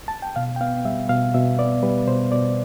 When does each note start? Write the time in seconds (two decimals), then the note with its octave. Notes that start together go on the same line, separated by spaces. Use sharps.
0.08 A5
0.22 G5
0.36 B2 F5
0.56 G5
0.61 B3 F5
0.85 G3 E5
1.09 B2 F5
1.34 B2 E5
1.59 B3 D5
1.83 G3 B4
2.08 B2 C5
2.32 B2 D5